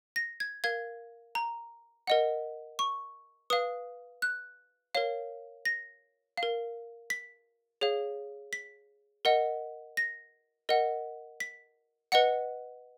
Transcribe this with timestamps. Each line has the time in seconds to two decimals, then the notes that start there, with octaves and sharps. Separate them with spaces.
0.16 A#6
0.40 G#6
0.64 A#4 F5 G#6
1.35 A#5
2.07 A#4 D#5 F#5
2.79 C#6
3.50 B4 F5 D#6
4.22 F#6
4.95 A#4 C#5 F5
5.65 A#6
6.37 F5
6.43 A#4
7.10 B6
7.81 G#4 C#5 F5
8.53 B6
9.25 A#4 D#5 F#5
9.97 A#6
10.69 A#4 D#5 F#5
11.40 B6
12.12 B4 D#5 F#5 C#7